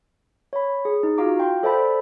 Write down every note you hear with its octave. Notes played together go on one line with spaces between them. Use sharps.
C#5 B5
G#4
D#4
F4 F#4 F5 A#5 D6
F5 G5 C6
A4 C5 D5 E5 A5 B5